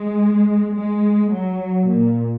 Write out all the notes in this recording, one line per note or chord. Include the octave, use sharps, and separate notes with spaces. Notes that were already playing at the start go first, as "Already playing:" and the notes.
Already playing: G#3
G#3
F#3
A#2